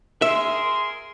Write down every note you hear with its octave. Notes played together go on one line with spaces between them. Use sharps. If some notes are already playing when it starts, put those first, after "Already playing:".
G#4 A#4 E5 C6